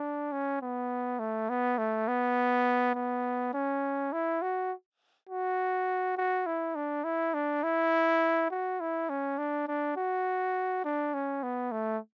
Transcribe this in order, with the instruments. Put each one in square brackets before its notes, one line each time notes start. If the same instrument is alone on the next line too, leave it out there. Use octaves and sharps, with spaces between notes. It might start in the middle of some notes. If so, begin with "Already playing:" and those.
Already playing: [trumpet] D4
C#4
B3
A3
B3
A3
B3
B3
C#4
E4
F#4
F#4
F#4
E4
D4
E4
D4
E4
F#4
E4
C#4
D4
D4
F#4
D4
C#4
B3
A3